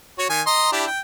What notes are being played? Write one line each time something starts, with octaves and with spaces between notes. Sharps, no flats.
F#4 C#5
D#3 G#5
D#5 A#5 C6
D4 E4 G4
G5